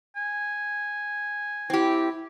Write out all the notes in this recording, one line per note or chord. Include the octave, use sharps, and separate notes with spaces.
G#5
C4 E4 G4